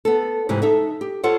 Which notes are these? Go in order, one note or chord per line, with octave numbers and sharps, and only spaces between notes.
B3 A4
G#2 C3 E3
D#4 A4 E5
G4
F4 A4 C5 C#5 F#5